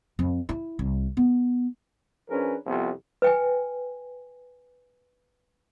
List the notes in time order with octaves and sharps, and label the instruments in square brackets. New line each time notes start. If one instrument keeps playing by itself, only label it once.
[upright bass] F2
E4
C2
B3
[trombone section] F3 C#4 D4 G#4 A#4 B4
C2 F2 C3 F3 B3
[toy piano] B4 G5 G#5